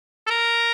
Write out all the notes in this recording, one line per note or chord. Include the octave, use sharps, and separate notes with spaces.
A4
A#4